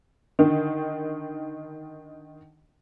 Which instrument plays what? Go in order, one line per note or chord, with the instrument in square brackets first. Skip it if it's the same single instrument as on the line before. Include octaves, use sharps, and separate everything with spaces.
[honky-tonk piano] D3 D#3